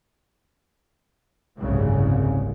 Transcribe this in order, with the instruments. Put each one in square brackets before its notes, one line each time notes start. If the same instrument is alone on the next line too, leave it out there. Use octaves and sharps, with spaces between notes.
[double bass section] F#1 C2 G#2 C#3